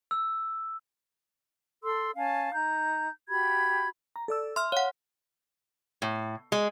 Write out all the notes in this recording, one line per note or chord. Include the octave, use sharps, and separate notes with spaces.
E6
A4 C6 E6
C#4 F5 G#5 A5
D#4 A#5 G6
F#4 G4 B5 G#6
A#5
A4 D5 E6
E5 C6 F6
C#5 F5 F#5
A2
G#3